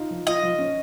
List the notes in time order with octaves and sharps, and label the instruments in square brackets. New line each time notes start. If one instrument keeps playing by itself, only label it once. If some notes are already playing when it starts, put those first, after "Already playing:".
Already playing: [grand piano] D#4 F4
F3
[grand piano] F4 [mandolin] D#5
[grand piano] F3
C#4